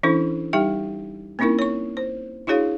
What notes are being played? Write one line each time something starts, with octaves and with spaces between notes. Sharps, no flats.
E3 C#4 D4 E4 A4 C5
G3 D#4 G4 E5 G5
A#3 C4 C#4 D#4 E4 A#4
C#5 C#6
C5
D4 E4 F#4 G#4 C#5 F5